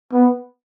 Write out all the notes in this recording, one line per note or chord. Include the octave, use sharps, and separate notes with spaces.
B3